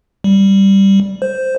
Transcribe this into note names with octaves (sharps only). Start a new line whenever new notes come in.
G3
C5